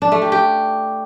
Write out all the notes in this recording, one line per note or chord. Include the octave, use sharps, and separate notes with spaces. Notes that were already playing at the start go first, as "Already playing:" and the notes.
D4
A3
G4
G4